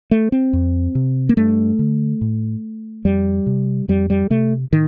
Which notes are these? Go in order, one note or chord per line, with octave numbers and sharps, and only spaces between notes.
A3
C4
F2
C3
A#3
G2 A3
D3
A2
F2 G3
C3
F2 G3
G3
C3 A3
A2 D#3